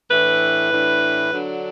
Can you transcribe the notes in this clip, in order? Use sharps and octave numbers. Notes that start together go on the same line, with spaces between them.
A2 E3 D4 B4
A2 E3 D4
D3 F#3 D4